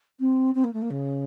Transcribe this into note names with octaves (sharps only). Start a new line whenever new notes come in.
C4
C4
A#3
A3
A#3
C#3